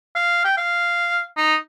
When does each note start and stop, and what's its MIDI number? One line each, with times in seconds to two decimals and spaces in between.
0.15 0.43 77
0.45 0.57 79
0.57 1.23 77
1.37 1.55 63